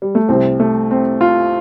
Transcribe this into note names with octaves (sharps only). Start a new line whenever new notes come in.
G3
A3
C2 C3 C4
A3
C4
F4